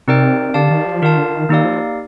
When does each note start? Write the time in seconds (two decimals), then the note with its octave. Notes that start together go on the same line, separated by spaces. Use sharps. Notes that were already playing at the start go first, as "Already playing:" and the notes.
0.07 C3 C4 D#4 A#4 D5 G5
0.54 D3 G4 D5 F5 A5
0.70 D#3
0.86 F3
1.02 D#3 F4 A#4 F5 A5
1.18 D3
1.33 D#3
1.49 D#3 A#3 D#4 G4 D5 F5
1.65 F3